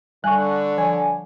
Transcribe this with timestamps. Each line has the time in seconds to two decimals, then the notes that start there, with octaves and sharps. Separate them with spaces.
0.24 D3 G3 G#5 C#6 F#6
0.78 F3 C#5 G#5